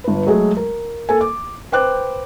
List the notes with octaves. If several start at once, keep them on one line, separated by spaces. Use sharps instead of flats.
G1 B4
F#3 G#3 A3 F#4 G#4
A#4
A#3 A4 G#5
D6
B4 C5 G5 D6 F#6